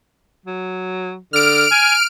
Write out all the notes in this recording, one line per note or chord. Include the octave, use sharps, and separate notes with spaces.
F#3
D3 F6 D7
G#5